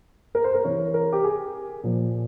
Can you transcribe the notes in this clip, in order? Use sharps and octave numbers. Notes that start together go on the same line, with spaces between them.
A#4
C5
A#4
C3 E3 C#5
A#4
G4
G#4
A#2 F3